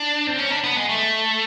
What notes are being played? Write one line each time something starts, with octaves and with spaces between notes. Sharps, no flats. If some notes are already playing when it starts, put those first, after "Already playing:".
Already playing: D4
C4
C#4
D4
B3
G#3
A3